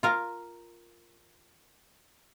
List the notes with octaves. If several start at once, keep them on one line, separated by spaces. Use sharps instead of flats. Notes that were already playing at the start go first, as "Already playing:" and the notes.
F4 A#4 F5